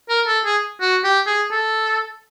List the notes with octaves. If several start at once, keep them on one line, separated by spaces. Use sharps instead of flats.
A#4
A4
G#4
F#4
G4
G#4
A4